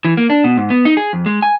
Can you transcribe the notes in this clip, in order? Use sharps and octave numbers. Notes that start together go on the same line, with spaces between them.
E3
A#3
D4
B2
G#2
B3
D#4
G#4
F2
G#3
G#5